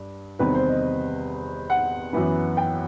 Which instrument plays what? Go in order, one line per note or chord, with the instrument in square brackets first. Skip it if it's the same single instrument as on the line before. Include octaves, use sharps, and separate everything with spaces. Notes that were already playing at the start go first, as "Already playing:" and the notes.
Already playing: [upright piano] G2
E2 C3 D#3 G3 C4 B4
C5
D#5
F#5
F#2 E3 B3
G5